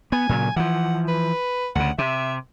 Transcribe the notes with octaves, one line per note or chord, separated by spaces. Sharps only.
B3 G#5
A#2 C#3 F#3
E3 F3 F#5
B4
D2 C#3 F#5
C3 E5